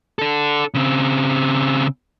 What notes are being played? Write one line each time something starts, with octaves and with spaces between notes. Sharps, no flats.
D4 A4
C#3 C4